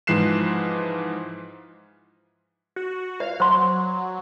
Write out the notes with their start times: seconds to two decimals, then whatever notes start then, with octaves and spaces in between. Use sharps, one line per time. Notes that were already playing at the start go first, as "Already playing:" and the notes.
0.07 G#2 E3 F3 F#6 C7 E7
2.76 F#4
3.20 B4 D5 E5 F5
3.40 F#3 C5 C6